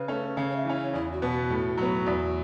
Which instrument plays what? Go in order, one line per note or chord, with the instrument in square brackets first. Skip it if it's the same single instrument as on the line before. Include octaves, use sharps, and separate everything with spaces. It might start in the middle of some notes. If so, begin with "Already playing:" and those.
Already playing: [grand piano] C#3 [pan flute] B4
[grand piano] A3 C#4
[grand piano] C#3 [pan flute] C#5
[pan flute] C#5
E5
[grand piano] E3 C#4
[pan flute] C#5
[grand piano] E2 [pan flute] E4
[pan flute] F#4
[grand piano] B2 B3
[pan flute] F#4
[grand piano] A2
F#3 B3
E2